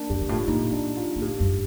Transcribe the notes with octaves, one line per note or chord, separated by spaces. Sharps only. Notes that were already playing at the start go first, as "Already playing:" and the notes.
Already playing: A#3 D4
G2 G4
G2
A2 F4
A#2 D#4
D4
F4
A#2
A2 G4
G2